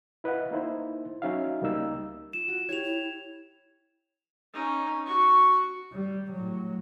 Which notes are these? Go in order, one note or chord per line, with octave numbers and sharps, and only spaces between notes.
E4 B4 D#5 F5 F#5
A#3 D#4 E4 C5
F#3 C#4 D#4 F#4 E5 F5
C#2 G3 A#3 D#4 E6
F4 E7
F#4
E4 G4 C#5 G#6 F7
E4
C#4 D#4
F#4 C#6
G3
A2 F#3